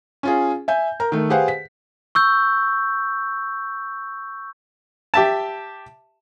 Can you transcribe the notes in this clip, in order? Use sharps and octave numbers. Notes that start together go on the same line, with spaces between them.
C#4 F4 G#4
E5 G#5 G6
A#4 A#5
D#3 A3
G4 G#4 B4 C5 F5 F#5
B6
C#6 E6 G6
G4 E5 A5